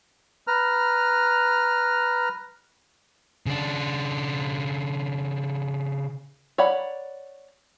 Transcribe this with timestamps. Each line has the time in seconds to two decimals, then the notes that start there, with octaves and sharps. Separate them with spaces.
0.47 B4 A#5 F6
3.46 C#3 D4
6.58 C#5 D5 F#5 A#5 B5